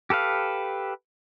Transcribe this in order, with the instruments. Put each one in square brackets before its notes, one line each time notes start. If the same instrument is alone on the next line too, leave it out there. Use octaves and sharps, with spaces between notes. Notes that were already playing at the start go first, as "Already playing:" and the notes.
[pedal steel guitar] G4 A4 B4 F5